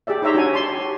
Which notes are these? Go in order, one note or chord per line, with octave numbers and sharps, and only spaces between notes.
G4 G#4 D5 E5
D#4 G4 C#5 E5 A#5 C6
D4 F#4 C#5 G#5
C#5 A5 C6
G4